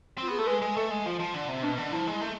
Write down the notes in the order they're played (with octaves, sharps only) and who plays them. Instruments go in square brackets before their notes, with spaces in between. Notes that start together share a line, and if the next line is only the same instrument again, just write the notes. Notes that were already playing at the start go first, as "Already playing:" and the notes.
[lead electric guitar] C4 [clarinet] F4
[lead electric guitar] B3 [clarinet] G#4
[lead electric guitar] A3 [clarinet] A4
[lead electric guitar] G#3 [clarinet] B4
[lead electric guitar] G#3
[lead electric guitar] A3 [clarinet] A4
[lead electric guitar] G#3
[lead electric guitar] F3 [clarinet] F4
[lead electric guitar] F3
D3
C3
[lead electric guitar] B2 [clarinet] D4
[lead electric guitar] D3
[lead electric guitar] F3 [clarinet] E4
[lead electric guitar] G#3
A3